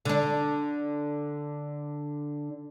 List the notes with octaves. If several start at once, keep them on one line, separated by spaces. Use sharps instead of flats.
D3 D4